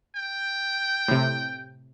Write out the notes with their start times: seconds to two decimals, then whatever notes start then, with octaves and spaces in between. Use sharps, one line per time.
0.15 G5
1.08 A2 C3